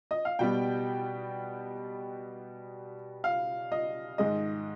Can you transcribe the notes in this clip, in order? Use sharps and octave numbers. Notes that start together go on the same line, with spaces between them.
D#5
F5
B2 G3 B3 G5
F5
D#5
G#2 D#3 G#3 D#5